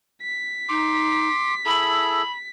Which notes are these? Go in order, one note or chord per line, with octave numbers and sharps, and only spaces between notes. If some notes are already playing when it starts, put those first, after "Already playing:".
B6
D#4 C6 D6
E4 G#4 A4 B5